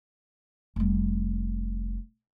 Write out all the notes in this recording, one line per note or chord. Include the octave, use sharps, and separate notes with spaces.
F1 G3